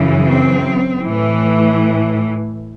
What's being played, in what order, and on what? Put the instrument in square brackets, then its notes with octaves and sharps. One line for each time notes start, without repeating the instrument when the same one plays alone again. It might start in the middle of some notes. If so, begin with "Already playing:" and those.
Already playing: [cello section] F#2 C#3 E3
C4
A2 E3